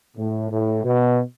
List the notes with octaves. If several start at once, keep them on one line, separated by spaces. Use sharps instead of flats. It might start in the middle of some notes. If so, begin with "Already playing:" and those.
A2
A2
B2